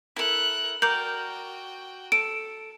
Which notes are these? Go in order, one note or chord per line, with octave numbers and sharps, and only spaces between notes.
E4 A4 A#4 F#6
F#4 A#4 D5 G5 G6 F#7
A4 D7